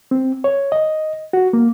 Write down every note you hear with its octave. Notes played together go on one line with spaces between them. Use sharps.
C4
C#5
D#5
F#4
A#3